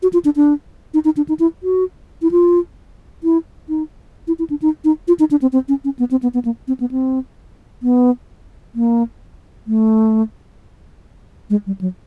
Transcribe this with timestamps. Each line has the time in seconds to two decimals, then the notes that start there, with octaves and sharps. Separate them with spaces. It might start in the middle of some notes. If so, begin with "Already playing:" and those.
0.02 F#4
0.13 F4
0.25 D4
0.36 D4
0.94 D#4
1.05 D#4
1.17 D4
1.28 D#4
1.40 E4
1.63 F#4
2.22 E4
2.31 F4
3.24 E4
3.69 D#4
4.27 E4
4.39 E4
4.50 D4
4.62 D#4
4.84 D#4
5.08 F4
5.19 D#4
5.31 D4
5.42 C4
5.53 C4
5.68 C#4
5.84 C#4
5.99 B3
6.11 C4
6.23 B3
6.34 B3
6.45 A#3
6.68 C4
6.80 B3
6.91 C4
7.83 B3
8.75 A#3
9.67 A3
11.50 G#3
11.66 G3
11.81 F#3